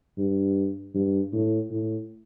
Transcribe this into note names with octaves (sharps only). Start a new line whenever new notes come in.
G2
G2
A2
A2